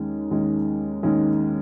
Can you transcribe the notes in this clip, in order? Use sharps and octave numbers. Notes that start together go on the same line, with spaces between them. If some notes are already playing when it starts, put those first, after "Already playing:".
Already playing: D#2 D#3 G#3 C#4
D#2 D#3 G#3 C#4
D#2 D#3 G#3 C#4